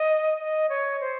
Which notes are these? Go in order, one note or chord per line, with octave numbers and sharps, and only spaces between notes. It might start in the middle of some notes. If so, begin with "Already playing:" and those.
Already playing: D#5
D#5
C#5
C5